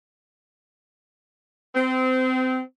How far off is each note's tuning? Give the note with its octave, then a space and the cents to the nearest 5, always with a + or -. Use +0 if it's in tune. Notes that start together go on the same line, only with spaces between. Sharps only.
C4 -25